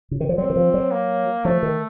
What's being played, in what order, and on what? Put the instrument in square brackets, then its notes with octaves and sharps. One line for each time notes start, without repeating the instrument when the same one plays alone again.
[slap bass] C#3
D#3
F3
[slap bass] F#3 [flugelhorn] C4
[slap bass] D#3
F3
F#3
[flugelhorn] A#3
[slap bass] F3 [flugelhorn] A3
[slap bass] D#3